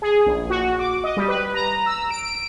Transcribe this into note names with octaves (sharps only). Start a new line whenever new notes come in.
G#4
A#1
F#4
D6
D#5
G3
B4
A#5
E6
D7